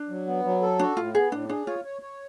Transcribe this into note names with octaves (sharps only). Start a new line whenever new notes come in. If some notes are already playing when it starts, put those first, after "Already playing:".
Already playing: D4
F#3
B3
F#3
A4
D4 F#4
A2 F4
B3 G#4
A2 D4
D4 G#4
F4 C#5
C#5
C#5